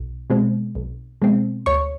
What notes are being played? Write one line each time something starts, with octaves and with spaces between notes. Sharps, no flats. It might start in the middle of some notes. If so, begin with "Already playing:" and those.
Already playing: B1
B2 G#3 C4
B1
B2 G#3 C4
D2 C#5 C#6